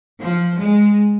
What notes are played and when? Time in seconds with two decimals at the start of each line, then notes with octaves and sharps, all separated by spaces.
0.20 F3
0.57 G#3